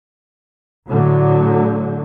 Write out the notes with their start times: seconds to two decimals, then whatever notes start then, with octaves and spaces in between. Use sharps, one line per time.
0.87 A2 D3 F#3